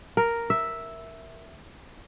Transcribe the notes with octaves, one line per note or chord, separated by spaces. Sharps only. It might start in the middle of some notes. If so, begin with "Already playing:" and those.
A#4
E5